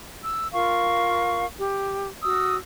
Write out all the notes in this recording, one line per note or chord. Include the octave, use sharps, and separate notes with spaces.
E6
F4 A#4 F5 C#6
G4
F#4 D#6 E6